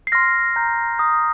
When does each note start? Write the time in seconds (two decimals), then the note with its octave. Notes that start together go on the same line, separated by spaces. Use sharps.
0.07 C7
0.12 C6 F6 A#6
0.56 A#5 G6
0.99 A#5 D#6 G6